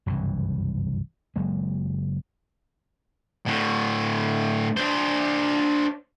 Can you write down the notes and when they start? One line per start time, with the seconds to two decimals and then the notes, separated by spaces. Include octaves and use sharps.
0.06 F#1 C2 G2 E3
1.36 F#1 F#3 G#3 A#3
3.46 A2 D3
4.77 D4 C5